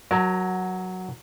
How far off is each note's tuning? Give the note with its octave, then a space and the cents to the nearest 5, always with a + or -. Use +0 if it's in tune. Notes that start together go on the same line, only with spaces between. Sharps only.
F#3 +0 A#4 +15 A5 +35